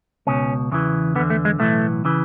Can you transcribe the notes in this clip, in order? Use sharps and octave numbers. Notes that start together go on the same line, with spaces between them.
C#2 B2 C#4
E2 C#3 E3
E2 D3 B3
A3
G#3
B1 A2 E3 A3
C#3 E3